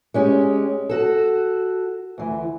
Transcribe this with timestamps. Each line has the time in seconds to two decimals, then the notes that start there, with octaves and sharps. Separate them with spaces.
0.14 G#3 C#4 G4
0.89 F#4 A4
2.18 D2 E3